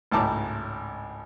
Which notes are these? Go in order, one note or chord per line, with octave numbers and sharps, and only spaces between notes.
G#1 C#2 A2 A5 A#5 D6